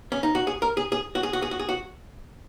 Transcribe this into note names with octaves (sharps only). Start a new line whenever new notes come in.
C#4
D#4
F#4
G#4
A#4
G#4
G#4
F#4
G#4
F#4
G#4
F#4
G#4
F#4